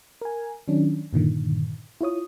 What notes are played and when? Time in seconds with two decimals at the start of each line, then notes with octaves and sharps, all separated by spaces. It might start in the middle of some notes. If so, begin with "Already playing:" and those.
0.22 A#4 G#5
0.68 D#3 F#3 C#4 D4
1.13 G2 A#2 D3 D#3
2.01 E4 F4 C#5 D#6